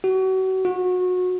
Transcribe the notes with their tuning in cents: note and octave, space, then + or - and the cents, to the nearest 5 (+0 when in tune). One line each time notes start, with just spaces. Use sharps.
F#4 +35
F#4 -25